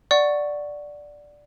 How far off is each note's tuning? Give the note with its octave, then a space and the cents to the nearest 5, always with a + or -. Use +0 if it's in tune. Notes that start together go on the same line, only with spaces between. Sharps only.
D5 +0 F#5 +0 C#6 +0